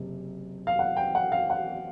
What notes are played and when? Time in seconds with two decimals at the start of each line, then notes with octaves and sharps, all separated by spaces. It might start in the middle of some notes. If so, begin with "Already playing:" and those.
Already playing: F#1 C3
0.67 F5
0.79 F#5
0.97 G5
1.15 F#5
1.32 F5
1.50 F#5